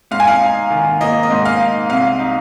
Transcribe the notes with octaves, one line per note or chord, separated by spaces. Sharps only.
G#2 F5
G#5
F5
D#4
D#3
A#3 D#5
D#5
G#2
F5
D#4
C2 F5
D#4